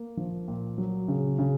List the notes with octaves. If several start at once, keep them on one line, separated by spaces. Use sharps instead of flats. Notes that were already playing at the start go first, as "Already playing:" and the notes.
Already playing: A#3
F3
A#2
F#3
C#3
C#3